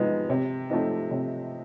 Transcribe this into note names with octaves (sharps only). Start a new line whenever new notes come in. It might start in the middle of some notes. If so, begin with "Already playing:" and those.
Already playing: C3 F3 G#3 B3 D#4
C3
F3 A3 C4 D#4
C3